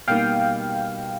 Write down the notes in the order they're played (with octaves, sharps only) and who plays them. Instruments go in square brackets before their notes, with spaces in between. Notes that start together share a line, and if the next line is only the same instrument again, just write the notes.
[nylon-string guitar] B2 G3 A#3 D#4 [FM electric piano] F5 G5